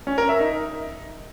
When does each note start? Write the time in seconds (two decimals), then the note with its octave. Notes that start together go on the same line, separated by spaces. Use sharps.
0.07 C#4
0.18 A#4
0.29 E5
0.40 D#4